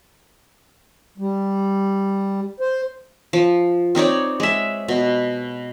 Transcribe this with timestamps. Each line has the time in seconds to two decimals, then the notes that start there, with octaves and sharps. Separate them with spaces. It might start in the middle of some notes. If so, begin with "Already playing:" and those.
1.18 G3
2.60 C5
3.33 F3
3.95 C4 D#4 C#5 D5
4.40 G#3 E5
4.88 B2